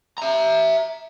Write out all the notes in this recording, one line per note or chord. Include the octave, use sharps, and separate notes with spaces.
E5 A#5